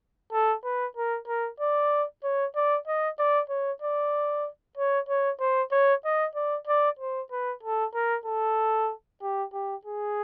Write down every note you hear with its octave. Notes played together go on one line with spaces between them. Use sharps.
A4
B4
A#4
A#4
D5
C#5
D5
D#5
D5
C#5
D5
C#5
C#5
C5
C#5
D#5
D5
D5
C5
B4
A4
A#4
A4
G4
G4
G#4